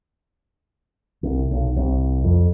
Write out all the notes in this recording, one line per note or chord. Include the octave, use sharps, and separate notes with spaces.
C2
B1
C2
F2